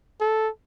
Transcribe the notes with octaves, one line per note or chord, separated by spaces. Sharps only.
A4